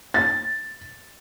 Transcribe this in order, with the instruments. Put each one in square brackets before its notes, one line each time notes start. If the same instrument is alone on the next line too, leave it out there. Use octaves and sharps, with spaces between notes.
[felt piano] A6